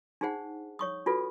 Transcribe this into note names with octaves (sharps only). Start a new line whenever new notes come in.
D4 D#4 G#4 C5 F#5
C#5 C#6 D#6
D4 F4 F#4 A4 B4